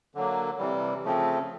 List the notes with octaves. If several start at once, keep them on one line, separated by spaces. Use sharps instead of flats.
D3 F#3 A#3
C3 E3 G3
C#3 F3 A3 C4